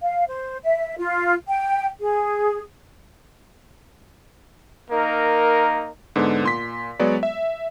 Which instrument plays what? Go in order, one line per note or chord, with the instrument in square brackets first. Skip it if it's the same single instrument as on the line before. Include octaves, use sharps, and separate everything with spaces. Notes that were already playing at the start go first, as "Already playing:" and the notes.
[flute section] F5
C5
E5
F4
G5
G#4
[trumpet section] A#3 D#4 A#4
[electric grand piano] G#2 D3 B3
A#2 C6 B6
F#3 G#3 B3 F#4 C#5 D5
E5